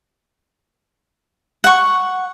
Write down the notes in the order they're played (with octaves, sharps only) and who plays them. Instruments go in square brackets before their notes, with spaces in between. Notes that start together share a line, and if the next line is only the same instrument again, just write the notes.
[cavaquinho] F#5 C#6